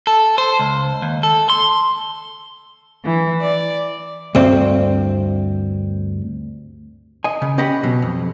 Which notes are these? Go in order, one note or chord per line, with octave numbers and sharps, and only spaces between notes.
A4
C5
C#2
D#2
A4
C6
E3
D5
D2 G2 C4
D#5 G#5
C#3
C#4 G4 D#5 F#5 B5
B2 F#3
F2